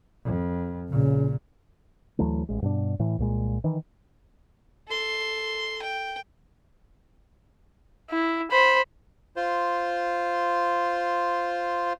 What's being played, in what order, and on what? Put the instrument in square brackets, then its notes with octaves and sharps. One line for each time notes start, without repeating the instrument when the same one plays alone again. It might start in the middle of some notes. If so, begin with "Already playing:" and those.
[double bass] F2
[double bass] A#1 A#2 [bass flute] C#3
[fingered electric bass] D2 E3 F#3 A3
A1 G#3
G2 B2 D4
A2 E3
C2 A#2 G#3
D#3 E3
[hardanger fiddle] A4 C6
G5
[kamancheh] E4
C5 B5
[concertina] F4 C5